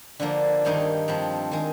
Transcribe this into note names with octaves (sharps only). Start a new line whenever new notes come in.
D3 F3 A#3
G2 D#3 A#3 D#4
G2 F3 C4
D#3 G#3